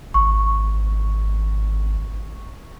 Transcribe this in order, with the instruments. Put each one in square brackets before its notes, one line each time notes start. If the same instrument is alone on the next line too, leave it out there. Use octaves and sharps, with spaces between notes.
[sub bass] G#1 [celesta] C#6